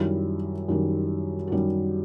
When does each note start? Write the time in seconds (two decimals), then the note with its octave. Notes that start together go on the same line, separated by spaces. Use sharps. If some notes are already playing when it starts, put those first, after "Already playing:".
Already playing: F#2 D#3 G3 E4
0.69 F#2 D#3 G3
1.47 F#4
1.52 F#2 D#3 G3 G4